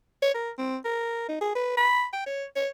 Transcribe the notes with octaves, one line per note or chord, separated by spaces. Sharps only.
C#5
A#4
C4
A#4
D#4
G#4
B4
B5
G5
C#5
C#5